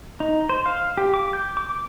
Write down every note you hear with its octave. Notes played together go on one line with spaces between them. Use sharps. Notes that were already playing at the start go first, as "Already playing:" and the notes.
D#4
C5
F5
G4
D6
G6
D6